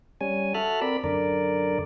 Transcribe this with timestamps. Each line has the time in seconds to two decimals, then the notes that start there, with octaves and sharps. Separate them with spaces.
0.21 G3 C#4 G#5
0.54 F#4 A4 E5 A5 F6 F#6
0.81 C4 A#4 D5 B5
1.04 F#2 D3 A#4 D5